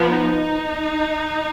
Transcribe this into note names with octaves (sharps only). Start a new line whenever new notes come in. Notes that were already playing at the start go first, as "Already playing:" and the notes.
Already playing: F3 B3
D#4